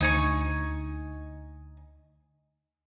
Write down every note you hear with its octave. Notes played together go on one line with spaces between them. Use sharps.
D2 D#4 G#5 C#6